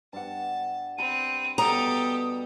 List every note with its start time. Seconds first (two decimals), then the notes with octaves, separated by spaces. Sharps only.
0.13 G2 F#5 A5
0.98 C4 A5 B5 D#7
1.58 B2 G3 G4 A4 A#5 D#6